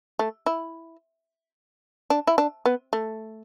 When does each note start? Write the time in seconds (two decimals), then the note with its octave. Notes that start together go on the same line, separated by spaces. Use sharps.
0.19 A3
0.46 E4
2.10 D4
2.27 E4
2.38 D4
2.66 B3
2.93 A3